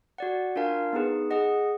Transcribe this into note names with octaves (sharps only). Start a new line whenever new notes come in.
F#4 D5 F#5
D4 F4 A#4 F5 G#5
B3 D#4 G#4 B4
G#4 D#5 F#5